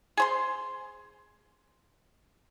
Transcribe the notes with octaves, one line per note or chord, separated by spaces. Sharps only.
G#4 C5 C6